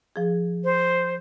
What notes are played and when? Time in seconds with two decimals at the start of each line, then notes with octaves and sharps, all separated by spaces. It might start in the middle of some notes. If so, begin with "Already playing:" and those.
0.16 F3 G#4
0.64 C5